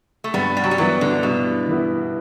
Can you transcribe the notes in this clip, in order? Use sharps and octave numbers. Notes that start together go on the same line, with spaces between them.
A3
G2 G3 B3
G3
F#3
G3
E3 F#3 B3 E4
D3
G2 B2
E3 B3 E4